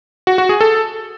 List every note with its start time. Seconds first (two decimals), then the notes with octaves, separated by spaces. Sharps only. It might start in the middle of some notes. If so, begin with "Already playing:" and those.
0.27 F#4
0.38 F#4
0.49 G#4
0.61 A4